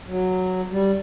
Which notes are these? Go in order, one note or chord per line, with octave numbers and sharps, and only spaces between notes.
F#3
G3